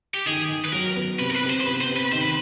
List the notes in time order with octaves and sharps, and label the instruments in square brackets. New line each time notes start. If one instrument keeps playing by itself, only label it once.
[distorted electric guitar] G4
[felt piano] D#3 [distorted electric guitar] G#4
[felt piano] D#3
[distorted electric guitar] B4
[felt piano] F#3 [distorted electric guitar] A#4
[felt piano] B3
[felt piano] C3 [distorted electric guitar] B4
[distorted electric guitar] A#4
B4
[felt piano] C3
[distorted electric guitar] C5
C5
[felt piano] B3 [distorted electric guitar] B4
[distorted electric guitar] C5
[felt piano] C3
[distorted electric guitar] B4
[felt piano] D#3 [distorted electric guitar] C5
[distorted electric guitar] B4